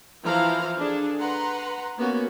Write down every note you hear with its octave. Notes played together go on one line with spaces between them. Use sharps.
E3 F3 E4 C5 F5 A#5
D4 G#4 A4
B4 F#5 A#5 C6
A#3 B3 C#4 F#4